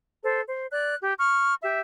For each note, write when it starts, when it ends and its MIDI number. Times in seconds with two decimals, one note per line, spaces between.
0.22 0.39 69
0.22 0.39 72
0.48 0.65 72
0.71 0.95 74
0.71 0.95 90
1.01 1.13 67
1.18 1.54 85
1.18 1.54 89
1.63 1.81 67
1.63 1.81 76